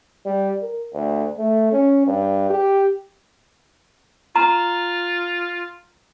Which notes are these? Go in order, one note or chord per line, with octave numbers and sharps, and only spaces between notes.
G3
A#4
D2
A3
C#4
G2
G4
F4 A#5